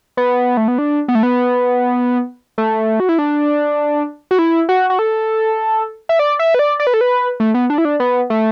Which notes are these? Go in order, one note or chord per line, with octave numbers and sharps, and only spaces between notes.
B3
A3
B3
D4
B3
A3
B3
A3
F#4
E4
D4
F#4
E4
F#4
F#4
A4
E5
D5
E5
B4
D5
D5
B4
A4
B4
A3
B3
D4
E4
D4
B3
A3